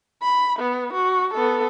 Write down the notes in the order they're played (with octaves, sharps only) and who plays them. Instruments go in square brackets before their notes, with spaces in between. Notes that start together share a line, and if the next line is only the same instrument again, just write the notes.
[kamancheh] B5
B3
F#4
B3 A4